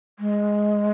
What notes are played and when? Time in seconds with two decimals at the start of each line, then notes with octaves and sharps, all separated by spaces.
0.19 G#3